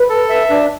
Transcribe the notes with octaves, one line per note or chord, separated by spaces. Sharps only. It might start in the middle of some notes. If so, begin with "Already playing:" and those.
Already playing: B4
A4
E5
D4